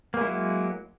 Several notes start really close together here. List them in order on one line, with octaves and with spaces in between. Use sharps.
A#3 G#3 E4 F#3